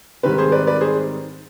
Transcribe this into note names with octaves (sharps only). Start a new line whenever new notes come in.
G#2 D#3 G3 C4 G4 B4
G#4 C5
B4 D5
B4 D5
G#4 C5